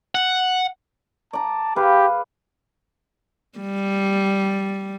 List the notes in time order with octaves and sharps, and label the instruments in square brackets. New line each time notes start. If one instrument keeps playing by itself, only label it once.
[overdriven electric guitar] F#5
[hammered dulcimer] D5 A#5 [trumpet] A5
[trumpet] G4 [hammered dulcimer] G#4 B4 F5
[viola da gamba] G3